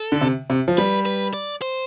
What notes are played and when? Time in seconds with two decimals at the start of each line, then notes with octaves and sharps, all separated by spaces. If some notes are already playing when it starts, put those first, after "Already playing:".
Already playing: A4
0.12 D3
0.21 C3
0.50 C3
0.68 F3
0.77 G3 B4
1.06 B4
1.34 D5
1.62 C5